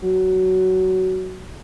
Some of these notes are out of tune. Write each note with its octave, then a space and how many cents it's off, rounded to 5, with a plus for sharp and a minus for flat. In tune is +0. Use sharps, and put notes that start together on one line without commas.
F#3 +15